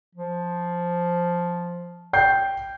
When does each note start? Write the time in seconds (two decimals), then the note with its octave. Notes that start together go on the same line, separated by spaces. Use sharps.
0.15 F3
2.13 G5 G6 C7